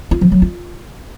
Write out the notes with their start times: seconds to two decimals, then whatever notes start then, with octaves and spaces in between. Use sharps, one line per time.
0.11 F4
0.21 F3
0.32 F#3
0.42 F4